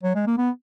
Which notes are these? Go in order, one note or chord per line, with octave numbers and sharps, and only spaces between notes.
F#3
G#3
A#3
B3